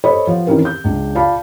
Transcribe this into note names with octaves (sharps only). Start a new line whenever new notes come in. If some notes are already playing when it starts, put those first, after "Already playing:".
A4 C5 C#5 D#5 B5
F3 B3
D#3 E3 C4 C#4 A#4 B4
G6
C#2 C#3 D4
F4 D5 F5 A5 B5